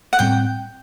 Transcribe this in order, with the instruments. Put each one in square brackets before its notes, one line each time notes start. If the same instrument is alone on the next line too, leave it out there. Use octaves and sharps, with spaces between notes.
[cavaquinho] F#5
[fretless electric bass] A2 G3 C4 [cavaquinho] G5